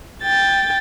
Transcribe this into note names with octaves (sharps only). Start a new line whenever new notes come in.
G5 A6